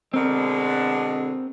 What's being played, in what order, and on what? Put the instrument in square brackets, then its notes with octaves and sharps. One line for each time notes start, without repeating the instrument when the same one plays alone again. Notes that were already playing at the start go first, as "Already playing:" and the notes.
[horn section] B2 D3 G#3 [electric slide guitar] C4 A#4